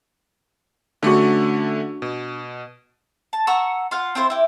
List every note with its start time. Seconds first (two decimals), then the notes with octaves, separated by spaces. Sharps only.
1.03 D3 A3 C#4 D4 F#4
2.02 B2
3.33 A5
3.47 F#5 A#5 C#6 E6
3.91 F4 F5 F#5
4.15 C4 E4 F4 C5
4.30 E4 G4